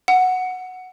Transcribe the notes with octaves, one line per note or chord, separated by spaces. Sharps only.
F#5